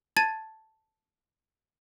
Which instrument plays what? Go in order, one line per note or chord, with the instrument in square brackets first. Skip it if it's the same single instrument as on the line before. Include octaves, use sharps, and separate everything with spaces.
[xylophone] A5 G#6 A6 D#7